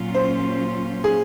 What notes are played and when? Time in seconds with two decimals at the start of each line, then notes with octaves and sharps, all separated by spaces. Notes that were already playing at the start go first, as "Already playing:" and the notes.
Already playing: A#2 F#3 C#4 F4
0.14 C5
1.04 G#4